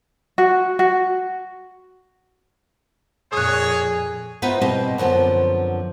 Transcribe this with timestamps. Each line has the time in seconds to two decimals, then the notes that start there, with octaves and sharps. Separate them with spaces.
0.38 F#4
0.79 F#4
3.33 F2 A#2 A#3 G#4 C#5 D#6 F#6
4.42 B3 D#4 F4 B4 C5 E5
4.61 B2 G3 C4 D#5
4.98 F#2 D3 F3 B3 C4